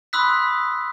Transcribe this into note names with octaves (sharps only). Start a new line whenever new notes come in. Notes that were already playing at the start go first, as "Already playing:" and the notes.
B5 C6 D#6 E6 F#6 B6